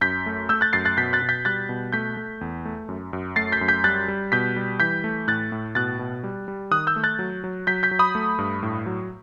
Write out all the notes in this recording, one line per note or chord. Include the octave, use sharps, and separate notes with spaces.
F#2 G6 B6
A3
A3 E6 G6
F#6 A6
F#2 A6 C7
F#6 A6
B2 G6 B6
F#6 A6
B2
G6 B6
G3 F#6 A6
B2
A3 G6 B6
A3
E2
A3
F#2
F#2
A3 A6 C7
G6 B6
F#2
G6 B6
G3 F#6 A6
G3
B2 G6 B6
G3
E3 G6 B6
A3
A2 F#6 A6
A2
B2 F#6 A6
B2
G3
G3
D#3 D#6 F#6
E6 G6
A3
F#6 A6
F#3
F#3
F#3 G6 B6
G6 B6
F#3
B5 D#6
A3
G2
A2
F#3